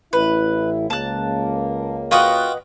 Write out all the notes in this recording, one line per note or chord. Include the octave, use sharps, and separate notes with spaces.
A1 E4 B4
C#2 A#3 A5 F#6
F4 F#4 B4 D#5 F#5 G5